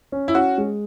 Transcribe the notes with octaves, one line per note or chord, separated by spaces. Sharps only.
C#4
E4
C#4 F#4
G#3